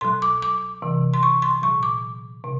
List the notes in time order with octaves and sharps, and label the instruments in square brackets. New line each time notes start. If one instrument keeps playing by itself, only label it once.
[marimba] B2 F#3 C6
D6
D6
C3 E3
C6
C#6
C6
A#2 F#3 C#6
D6
C3